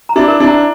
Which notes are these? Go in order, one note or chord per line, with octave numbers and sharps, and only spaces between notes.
A#5
D4 E4
A#4
D4 E4
A#5